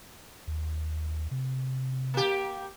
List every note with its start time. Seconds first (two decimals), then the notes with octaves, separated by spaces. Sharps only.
0.47 D#2
1.31 C3
2.14 A#3 G4